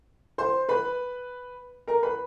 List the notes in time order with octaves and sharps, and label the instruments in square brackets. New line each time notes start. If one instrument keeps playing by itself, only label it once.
[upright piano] C5 C6
B4 B5
A#4 A#5
B4 B5